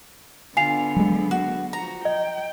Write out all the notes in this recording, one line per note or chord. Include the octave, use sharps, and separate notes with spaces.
D3 B3 F4 G#5 C7 F7
F#3 G#3
F#4
F3 F#4 A#5
D#5 G5